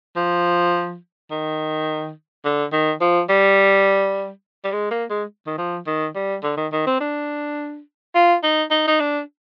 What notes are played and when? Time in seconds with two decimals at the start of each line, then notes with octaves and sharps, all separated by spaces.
0.16 F3
1.31 D#3
2.45 D3
2.72 D#3
3.01 F3
3.29 G3
4.64 G3
4.73 G#3
4.91 A#3
5.10 G#3
5.47 D#3
5.58 F3
5.87 D#3
6.16 G3
6.44 D3
6.57 D#3
6.72 D#3
6.87 C4
7.01 D4
8.15 F4
8.43 D#4
8.71 D#4
8.88 D#4
9.00 D4